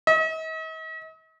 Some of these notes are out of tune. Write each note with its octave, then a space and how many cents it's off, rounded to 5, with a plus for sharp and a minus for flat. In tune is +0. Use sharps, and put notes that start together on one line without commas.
D#5 +45